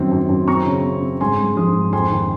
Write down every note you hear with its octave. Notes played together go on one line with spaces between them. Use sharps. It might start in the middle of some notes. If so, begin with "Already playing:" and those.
Already playing: F#2 D#3 C4
F#2
F#2
C4 A#5 C#6
C#3
C4
C4
G#2 G#5 C6
G#2
F3 C6 D#6
G#2
F2 G#5 C6
D#3